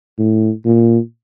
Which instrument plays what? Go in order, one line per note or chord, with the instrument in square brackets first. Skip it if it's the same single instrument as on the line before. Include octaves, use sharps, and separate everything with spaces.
[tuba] A2
A#2